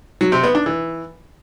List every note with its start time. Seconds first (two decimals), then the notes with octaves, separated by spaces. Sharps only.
0.21 F#3
0.32 C3
0.43 B3
0.55 D4
0.66 E3